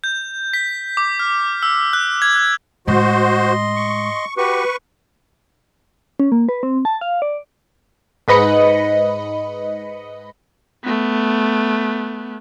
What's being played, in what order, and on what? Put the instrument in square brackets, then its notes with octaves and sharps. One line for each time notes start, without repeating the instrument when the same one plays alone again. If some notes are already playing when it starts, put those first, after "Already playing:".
[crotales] G6
B6
D6
F6
E6
F#6
G#6
F#6
[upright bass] A2 G#3 [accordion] F#4 C5 [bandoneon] D#5 C6
[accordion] C#6
[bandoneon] F#4 G4 [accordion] B4 C#6
[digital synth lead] C#4
A#3
B4
C4
A5
F5
D5
[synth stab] G#2 B4 D#5 B5 A#6 C#7
[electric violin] A3 B3